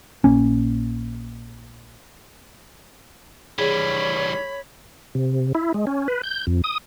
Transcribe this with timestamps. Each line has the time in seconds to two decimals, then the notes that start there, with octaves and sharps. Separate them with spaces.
0.24 A#1 A#3 C#4
3.59 E3 G3 G#4 C#5 B5
5.15 C3
5.55 E4
5.74 G#3
5.87 C#4
6.08 B4
6.23 G6
6.47 F2
6.64 D#6